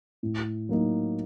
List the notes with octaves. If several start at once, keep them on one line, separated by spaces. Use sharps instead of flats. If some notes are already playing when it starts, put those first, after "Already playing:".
A2
F#3 A#3 D#4